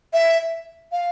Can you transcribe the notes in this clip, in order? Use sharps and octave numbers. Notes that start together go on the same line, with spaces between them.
E5
F5